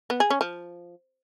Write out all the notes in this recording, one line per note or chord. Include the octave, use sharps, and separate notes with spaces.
B3
G#4
C#4
F3